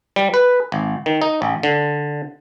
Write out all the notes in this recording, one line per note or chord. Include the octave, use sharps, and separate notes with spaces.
G3
B4
G#1
D#3
D#4
A1
D3